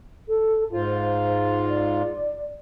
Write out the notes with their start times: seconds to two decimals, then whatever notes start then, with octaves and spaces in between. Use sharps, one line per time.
0.28 A4
0.73 G#2 F4 C5
1.68 D5